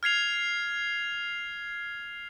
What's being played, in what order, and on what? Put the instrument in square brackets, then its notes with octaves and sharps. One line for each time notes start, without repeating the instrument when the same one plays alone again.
[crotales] F6 G#6 C7 F7